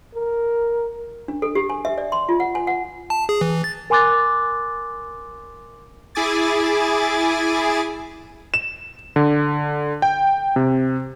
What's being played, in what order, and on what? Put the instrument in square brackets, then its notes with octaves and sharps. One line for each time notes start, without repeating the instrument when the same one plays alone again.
[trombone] A#4
[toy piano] D4
A4
G4
G#5
E5
D5
C6
F4
F#5
G#5
F#5
[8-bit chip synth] A5
G#4
E3
A6
[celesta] A#4 G#5 C6 D6 F#6 A6
[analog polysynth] E4 G#4 G#5 D6 A6
[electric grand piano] E7
D3
G5
C3